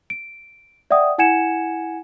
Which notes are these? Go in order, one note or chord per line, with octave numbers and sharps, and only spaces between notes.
D7
D5 E5 F#5 G5 D#6
E4 F#5 G#5 G#6 C#7 E7